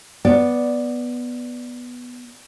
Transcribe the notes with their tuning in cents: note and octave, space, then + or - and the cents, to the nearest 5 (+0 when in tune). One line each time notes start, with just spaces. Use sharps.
B3 -5 D5 +0